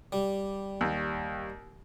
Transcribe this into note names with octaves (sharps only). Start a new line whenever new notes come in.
G3
D#2